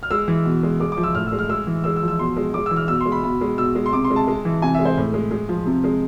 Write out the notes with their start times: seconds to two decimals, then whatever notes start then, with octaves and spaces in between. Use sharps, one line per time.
0.03 F6
0.11 G#3 E6
0.28 E3
0.45 B2
0.63 G#3
0.80 G#3 D6
0.92 D6
0.97 F3
1.04 E6
1.15 A2 F6
1.27 E6
1.32 G#3
1.39 F6
1.49 G#3 E6
1.67 E3
1.84 G#3 E6
1.96 E6
2.02 F3
2.08 E6
2.19 B2 C6
2.37 G#3
2.54 G#3 D6
2.66 E6
2.71 E3
2.76 F6
2.88 B2 E6
3.01 C6
3.06 G#3
3.12 B5
3.23 B2 B5
3.41 G#3
3.58 B2 E6
3.75 G#3
3.86 C6
3.93 C3 D6
4.04 C6
4.11 G#3
4.16 A5
4.28 G#3
4.45 E3
4.62 C3 G#5
4.74 E5
4.79 G#3
4.85 C5
4.97 A2
5.14 G#3
5.31 G#3
5.49 F3
5.66 C3
5.84 G#3